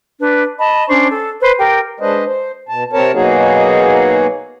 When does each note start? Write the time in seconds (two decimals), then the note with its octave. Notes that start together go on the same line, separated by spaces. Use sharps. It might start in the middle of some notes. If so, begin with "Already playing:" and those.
0.21 D4 B4
0.58 D#5 A5 B5
0.89 C#4 D4 C5 C#6
1.11 A4
1.41 B4 C5
1.58 G4 A#4 G5
2.00 G#3 D4 B4 C5 D#5
2.25 C5
2.69 B2 A5
2.93 C3 C4 A#4 C#5 A5
3.13 B2 F#3 A#3 D#4 F#4 G#4